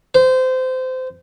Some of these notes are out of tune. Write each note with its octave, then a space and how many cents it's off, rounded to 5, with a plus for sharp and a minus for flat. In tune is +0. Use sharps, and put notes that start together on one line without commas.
C5 -25